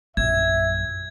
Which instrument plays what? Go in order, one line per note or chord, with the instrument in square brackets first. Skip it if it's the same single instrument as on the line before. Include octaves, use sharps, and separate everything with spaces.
[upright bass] A#1 F#2 [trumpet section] E5 [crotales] G#6